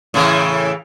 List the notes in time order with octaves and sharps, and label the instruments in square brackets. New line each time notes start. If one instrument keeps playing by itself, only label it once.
[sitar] A2 C#3 E3